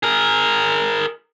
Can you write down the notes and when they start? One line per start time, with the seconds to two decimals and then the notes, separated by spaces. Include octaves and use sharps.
0.03 G#4 A#4